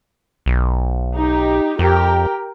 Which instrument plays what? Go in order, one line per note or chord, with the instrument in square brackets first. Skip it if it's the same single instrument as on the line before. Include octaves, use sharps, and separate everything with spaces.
[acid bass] B1
[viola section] D#4 G4
[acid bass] F2 [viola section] G4 A#4 G5